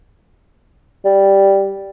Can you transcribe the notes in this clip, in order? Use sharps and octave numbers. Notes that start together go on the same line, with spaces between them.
G3